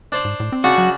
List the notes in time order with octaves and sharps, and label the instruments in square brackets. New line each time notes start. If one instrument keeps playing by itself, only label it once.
[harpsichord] D4 C5 D5
[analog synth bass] G#2
A2
C4
[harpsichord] C#3 D4 [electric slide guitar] F#4
[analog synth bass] F#3